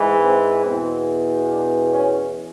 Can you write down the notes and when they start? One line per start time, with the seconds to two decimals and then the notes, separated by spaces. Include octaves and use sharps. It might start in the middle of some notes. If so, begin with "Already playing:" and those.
Already playing: G#2 E3
0.22 C4
0.64 E2 B2 C4
1.49 D4
1.92 C#4